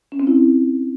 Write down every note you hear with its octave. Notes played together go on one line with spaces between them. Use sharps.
C#4
C4
E4